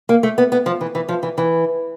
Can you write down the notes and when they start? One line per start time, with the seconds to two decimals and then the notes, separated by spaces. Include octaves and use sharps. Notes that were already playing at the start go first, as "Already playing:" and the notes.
0.09 A#3
0.23 A3
0.38 B3
0.52 B3
0.66 F3
0.81 E3
0.95 E3
1.09 F3
1.23 E3
1.38 E3